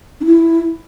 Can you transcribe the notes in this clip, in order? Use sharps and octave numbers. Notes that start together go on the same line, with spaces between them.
D4
E4